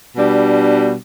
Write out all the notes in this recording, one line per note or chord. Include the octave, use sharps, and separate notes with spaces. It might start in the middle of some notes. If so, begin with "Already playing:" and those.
B2 G3 D4